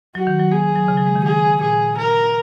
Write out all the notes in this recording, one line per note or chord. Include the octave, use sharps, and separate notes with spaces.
F#3 F#4
D#3
F#3
A#3 G#4
F#3
C#3
F#3
G#3
D#3
G#4
A#2 G#4
A#4